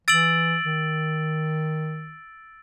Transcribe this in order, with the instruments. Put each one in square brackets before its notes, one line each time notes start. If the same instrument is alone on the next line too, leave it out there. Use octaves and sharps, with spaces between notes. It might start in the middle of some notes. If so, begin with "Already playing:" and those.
[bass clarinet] E3 [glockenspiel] E6 A6 D7 F#7
[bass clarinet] D#3